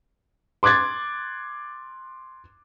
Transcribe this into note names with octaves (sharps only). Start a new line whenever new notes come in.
C6 D6 F#6 G#6 A6